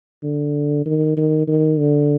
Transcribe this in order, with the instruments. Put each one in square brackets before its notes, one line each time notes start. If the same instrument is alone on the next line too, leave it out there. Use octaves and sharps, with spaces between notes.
[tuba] D3
D#3
D#3
D#3
D3